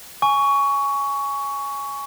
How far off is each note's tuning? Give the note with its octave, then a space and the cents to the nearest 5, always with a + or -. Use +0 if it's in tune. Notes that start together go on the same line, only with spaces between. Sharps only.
G#5 +0 C#6 +15